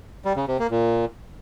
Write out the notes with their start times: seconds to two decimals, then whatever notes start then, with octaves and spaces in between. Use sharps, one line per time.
0.25 G3
0.36 C#3
0.48 C3
0.59 A#3
0.71 A#2